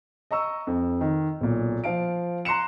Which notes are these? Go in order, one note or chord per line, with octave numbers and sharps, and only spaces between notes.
D#5 A#5 C#6 E6
F2
D#3
B1 A#2
F3 F5 D7
A#5 C6 F#6 C#7 E7